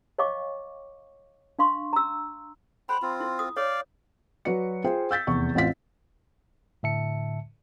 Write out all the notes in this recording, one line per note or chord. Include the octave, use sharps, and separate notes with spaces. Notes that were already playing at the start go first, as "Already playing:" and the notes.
C#5 D#5 F5 G5 C#6 D6
D4 F5 C6 C#6
A#5 E6
C5 F#5 G5 B5 C6
C4 F4
E4
D#6
C#5 D5 F5
F#3 F#4 B4 D5 C#7
F4 G#4 C5 G5
E6 G6 A6 B6
F1 E2 C#6
A1 C4 F4 B6
A2 D3 E5 A5 C#7